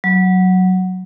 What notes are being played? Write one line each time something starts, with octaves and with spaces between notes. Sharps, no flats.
F#3